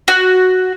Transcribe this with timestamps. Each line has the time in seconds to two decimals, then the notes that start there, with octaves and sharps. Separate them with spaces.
0.08 F#4